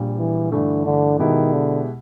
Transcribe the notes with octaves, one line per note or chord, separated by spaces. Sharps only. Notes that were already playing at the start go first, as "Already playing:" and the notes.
Already playing: A#1 A#2 G3
E3
G2 D3 E3 A3
D3
B2 D#3 G#3 B3 E4 G4
D3